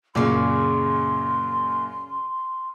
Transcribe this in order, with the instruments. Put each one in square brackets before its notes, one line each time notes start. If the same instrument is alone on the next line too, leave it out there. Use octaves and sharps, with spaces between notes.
[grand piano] F#2 A#2 [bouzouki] C#3 D5 [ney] C6